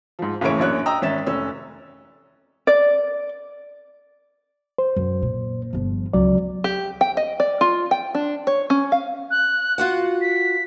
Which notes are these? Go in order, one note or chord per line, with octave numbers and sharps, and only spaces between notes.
G#2 F3
F#1 A2 C#3 E3 C#5 D7
A#1 F#2 C#5 F#6
D#5 G5 A#5 D#6 E6
G#1 C#4 E5 A6 E7
F1 C#4 E6
D5
C5
F#2
A#2
G1 F3
C#2 F#3 D5
G4
G5
D#5
D5
F4
G5
D4
C#5
C#4
F5
F#6
F4 F#4 F#5
B6